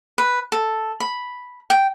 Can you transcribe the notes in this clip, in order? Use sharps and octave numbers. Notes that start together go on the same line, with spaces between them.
B4
A4
B5
G5